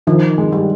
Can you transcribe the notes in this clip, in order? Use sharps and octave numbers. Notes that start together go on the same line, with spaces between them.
D#3 F3
G#3
G3